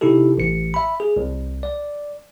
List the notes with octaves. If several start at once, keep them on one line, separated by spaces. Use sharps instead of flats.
C3 D#4 E4 G4 A4
A1 C#7
E5 B5
G#4
C2
D5